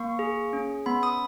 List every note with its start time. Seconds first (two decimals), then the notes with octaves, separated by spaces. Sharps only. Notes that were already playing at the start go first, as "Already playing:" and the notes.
Already playing: A#3 C#6
0.19 G#4
0.53 C#4
0.86 B3 B5
1.03 D#6